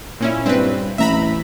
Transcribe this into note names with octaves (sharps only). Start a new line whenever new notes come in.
A#2 C#4 E4
G2 C4 B4
A1 E5 A#5 B5